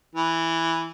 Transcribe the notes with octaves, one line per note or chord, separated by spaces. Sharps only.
E3